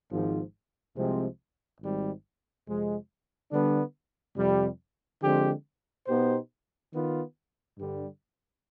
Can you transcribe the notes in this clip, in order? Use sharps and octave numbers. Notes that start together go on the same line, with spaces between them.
G#1 G#2 F3
C2 C3 F3 G#3 C4
G#1 G#2 G3
F2 C3 F3 G#3
D3 G3 B3 D4
F2 C3 G3
D3 F3 G#3 C4 G4
B2 B3 D#4 G4 C5
D#3 B3 F4
G2 D3 G3